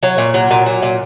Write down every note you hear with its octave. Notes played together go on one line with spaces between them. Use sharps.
F#3 C#5
A#2
F#3
A#2
F#3
A#2